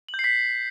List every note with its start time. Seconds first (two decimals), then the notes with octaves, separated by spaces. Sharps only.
0.09 F#7
0.14 G6
0.19 C7
0.24 B6